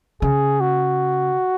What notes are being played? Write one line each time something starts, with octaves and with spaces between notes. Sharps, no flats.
C#3 G#4
F#4